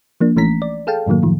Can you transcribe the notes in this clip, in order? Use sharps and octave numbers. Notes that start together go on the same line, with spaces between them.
F3 A#3 D4
A1 E3 A3 C#4 A#5 B6
D5
G#4 A4 F5 G5 A5
F#2 A2 D#3 F#3 A#3
A2 D#3 F3